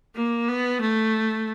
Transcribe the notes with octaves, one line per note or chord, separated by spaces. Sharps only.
A#3
B3
A3